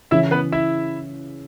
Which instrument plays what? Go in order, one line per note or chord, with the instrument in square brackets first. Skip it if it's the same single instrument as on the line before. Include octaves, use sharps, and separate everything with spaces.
[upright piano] C#3 E3 C#4 [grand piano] E4 E5
[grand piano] B3 B4
E4 E5